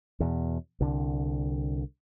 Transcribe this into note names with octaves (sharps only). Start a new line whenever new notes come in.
E2 B2
C2 D3